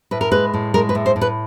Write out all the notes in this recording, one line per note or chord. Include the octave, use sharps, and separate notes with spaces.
A2 B4
A#4
G#3 B4
A2
G#3 A#4
B4
A2
C5
A2
B4